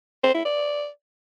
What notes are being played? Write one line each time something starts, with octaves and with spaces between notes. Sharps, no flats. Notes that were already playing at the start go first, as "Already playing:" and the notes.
C5
E4
D5